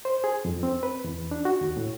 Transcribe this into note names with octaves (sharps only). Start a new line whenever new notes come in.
C5
G#4
F2
C4
B4
E2
D4
F#4
D#2
A2